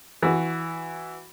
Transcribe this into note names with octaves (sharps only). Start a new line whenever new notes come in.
E3 F#4